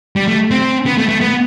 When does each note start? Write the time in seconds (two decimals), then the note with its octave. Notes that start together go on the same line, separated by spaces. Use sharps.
0.16 G3
0.28 A3
0.51 C4
0.86 B3
0.98 A3
1.08 A3
1.21 B3